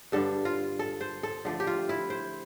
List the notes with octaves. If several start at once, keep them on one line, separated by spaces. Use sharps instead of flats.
G2 D3 G3 D4 A4
F4
A4
C5
A4
D3 F3 A3 D4
G4
F4
E4
C5